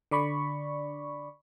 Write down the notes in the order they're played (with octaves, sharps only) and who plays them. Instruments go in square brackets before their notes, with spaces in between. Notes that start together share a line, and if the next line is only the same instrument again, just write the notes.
[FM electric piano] D3 D5 B5 C#6